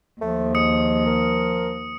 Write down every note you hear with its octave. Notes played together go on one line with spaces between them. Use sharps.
D#2 F3 A3
G#3 D#6 C#7
A#4